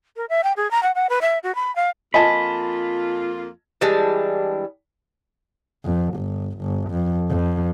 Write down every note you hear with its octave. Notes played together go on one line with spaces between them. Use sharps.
A#4
E5
G5
G#4
A#5
F#5
F#5
B4
E5
F#4
B5
F5
F2 A#3 F4 D#5 G#5 A5 B5
E3 G3 G#3 D4
F2
G1
G1
F2
F2